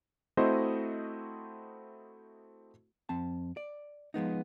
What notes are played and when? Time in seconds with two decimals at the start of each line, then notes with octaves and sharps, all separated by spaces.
0.37 A3 C4 E4 F#4 C5 D#5
3.09 F2 C4 A5
3.57 D5
4.14 F3 G#3 B3 D#4